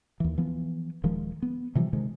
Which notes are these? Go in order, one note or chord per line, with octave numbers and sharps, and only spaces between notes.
D#2 E3
E3 F3 B3
D#1 D#3 F3 G#3
B3
C3 E3 F3 G3
C3 D#3 G#3